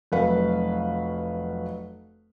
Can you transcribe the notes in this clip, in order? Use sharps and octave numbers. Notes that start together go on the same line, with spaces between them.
F1 F#3 B4 F5